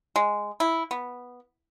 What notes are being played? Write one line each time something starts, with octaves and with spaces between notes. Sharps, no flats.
G#3
E4
B3